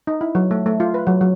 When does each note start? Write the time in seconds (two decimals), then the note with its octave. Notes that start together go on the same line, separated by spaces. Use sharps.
0.07 D#4
0.21 E4
0.35 F#3
0.51 A3
0.66 A3
0.80 F4
0.94 B4
1.07 F#3
1.21 F#3